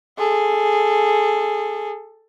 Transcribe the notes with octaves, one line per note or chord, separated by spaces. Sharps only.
G#4 A4